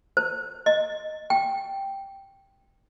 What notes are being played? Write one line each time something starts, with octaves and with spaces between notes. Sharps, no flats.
C5
D#5
G5